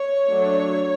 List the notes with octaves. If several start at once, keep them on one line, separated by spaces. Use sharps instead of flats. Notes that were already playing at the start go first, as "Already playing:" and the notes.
Already playing: C#5
F#3 A3 D4